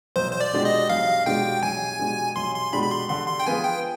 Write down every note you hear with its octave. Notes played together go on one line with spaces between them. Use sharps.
B1 C5
C5
D5
B2 G#3 D4 G4
D#5
B1 F5
B2 G#3 D4 G4 G5
B1 G#5
B2 G#3 D4 G4
B1 C6
C6
B2 G#3 D4 G4 B5
B5
C6
D3 C6
C6
G5
F3 B3 F4 G#4 G#5
G5